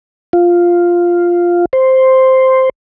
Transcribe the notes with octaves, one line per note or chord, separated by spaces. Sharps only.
F4
C5